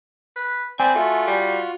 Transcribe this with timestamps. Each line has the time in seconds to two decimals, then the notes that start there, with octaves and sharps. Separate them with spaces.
0.36 B4
0.80 C4 D5 G#5 B5
0.95 A3 F4 F#4
1.27 G3